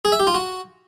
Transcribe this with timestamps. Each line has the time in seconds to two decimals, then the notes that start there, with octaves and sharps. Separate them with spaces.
0.05 G#4
0.12 E5
0.20 G4
0.27 F4
0.34 F#4